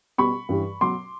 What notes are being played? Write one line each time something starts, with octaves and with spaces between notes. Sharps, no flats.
B2 G3 B5 C#6
G2 E3 G3
B2 F#3 C6 D6